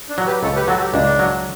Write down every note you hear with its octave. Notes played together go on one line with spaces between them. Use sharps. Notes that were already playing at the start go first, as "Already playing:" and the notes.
D4
F#3
G4 B4
C#2 A4 C#5
G4 B4
F#3 F#4 A4
G4
C#2 D4
F#3